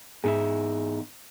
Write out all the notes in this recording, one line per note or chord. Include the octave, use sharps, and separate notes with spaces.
E2 G#2 D#4 G#4 E5